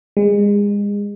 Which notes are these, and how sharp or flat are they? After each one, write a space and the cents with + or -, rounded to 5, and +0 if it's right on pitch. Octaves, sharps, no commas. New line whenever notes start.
G#3 -30